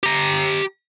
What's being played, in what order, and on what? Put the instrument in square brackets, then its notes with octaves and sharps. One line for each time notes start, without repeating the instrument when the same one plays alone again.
[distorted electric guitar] G4 A#5